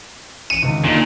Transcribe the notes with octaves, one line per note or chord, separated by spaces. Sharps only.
A1 C#7 D#7 E7
G#1 C#2
A#2 D3 D#4